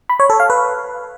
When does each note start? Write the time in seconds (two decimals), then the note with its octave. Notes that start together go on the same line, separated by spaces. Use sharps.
0.09 B5
0.20 C#5
0.30 A4
0.40 F5
0.50 B4